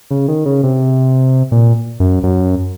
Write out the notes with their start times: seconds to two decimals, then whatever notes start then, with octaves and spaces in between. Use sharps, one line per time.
0.11 C#3
0.28 D#3
0.45 C#3
0.63 C3
1.52 A#2
2.00 F#2
2.23 F#2